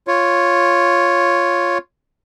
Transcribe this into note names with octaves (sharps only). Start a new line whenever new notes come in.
F4 C#5